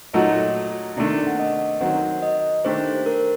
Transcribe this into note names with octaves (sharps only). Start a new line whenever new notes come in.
A#2 F#3 A3 D#4 F#4 D#5
C3 D#3 A3 D4 D5
F#5
D#5
D#3 F#3 C4 F#5
D#5
D#3 A3 D4 G4 C5
A#4